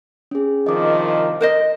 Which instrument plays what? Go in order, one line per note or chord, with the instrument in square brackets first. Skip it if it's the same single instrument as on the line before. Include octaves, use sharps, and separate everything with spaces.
[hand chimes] C#4 G#4
[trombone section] C2 D#3 F3 [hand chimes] D#5 D6
[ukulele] A#4 C5 D#5